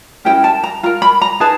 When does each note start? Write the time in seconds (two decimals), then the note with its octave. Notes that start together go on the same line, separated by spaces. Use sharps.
0.25 C#4 E4 G4 A#4 G5
0.44 A5
0.64 A#5
0.83 F4 A#4 A#5
1.02 B5
1.22 A#5
1.40 D#4 G#4 B4 A5